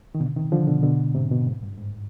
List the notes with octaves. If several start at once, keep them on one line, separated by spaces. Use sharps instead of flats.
D#3
B2 D3
C3 D#3
D3 F3
B2 D3
B2 D3
G#2 C3
B2
G#2
G2
G#2